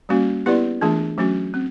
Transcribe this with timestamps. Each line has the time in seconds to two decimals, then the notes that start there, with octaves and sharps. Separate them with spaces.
0.09 G3 A#3 C#4 F#4
0.46 B3 E4 G4 B4 D5
0.81 E3 A3 D4 F4 G#4
1.18 F#3 A3 C#4 F#4
1.54 C4